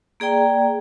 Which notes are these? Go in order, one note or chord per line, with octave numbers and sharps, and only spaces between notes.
A#3 G#4 D5 G5 A#5